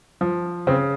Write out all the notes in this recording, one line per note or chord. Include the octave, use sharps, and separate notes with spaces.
F3
C#3 C4